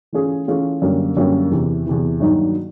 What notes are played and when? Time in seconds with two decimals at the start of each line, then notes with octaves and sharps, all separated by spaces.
0.13 E3 A3 C#4 F4 G#4
0.48 E3 A3 C#4 F4 G#4
0.82 F#2 D3 G3 A#3 C#4
1.17 F#2 D3 G3 A#3 C#4
1.51 E2 C3 E3
1.86 E2 C3 E3
2.20 G2 D#3 F#3 A#3 D#4